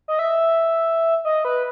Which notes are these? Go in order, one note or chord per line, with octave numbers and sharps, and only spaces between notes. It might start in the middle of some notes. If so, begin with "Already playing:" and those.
D#5
E5
D#5
B4